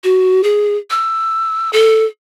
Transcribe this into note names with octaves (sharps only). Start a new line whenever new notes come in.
F#4
G#4
E6
A4